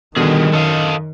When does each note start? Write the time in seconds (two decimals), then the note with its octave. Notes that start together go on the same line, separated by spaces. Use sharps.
0.16 B2 D3 D#3 G3 G#4
0.53 F#2 A4 D#5 F5